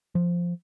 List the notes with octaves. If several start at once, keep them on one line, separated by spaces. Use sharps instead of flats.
F3